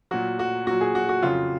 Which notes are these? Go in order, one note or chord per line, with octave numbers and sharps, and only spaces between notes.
A#2 F#3 F#4
F#4
A#2 F#3 F#4
G#4
F#4
F#4
F2 C#3 F#3 F4